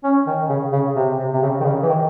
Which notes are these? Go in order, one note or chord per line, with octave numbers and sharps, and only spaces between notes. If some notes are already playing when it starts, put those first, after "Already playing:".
C#4
D#3
C#3
C#3
C3
C3
C3
C#3
D#3
C#3
E3
D#3